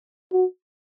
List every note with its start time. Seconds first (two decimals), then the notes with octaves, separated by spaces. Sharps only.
0.32 F#4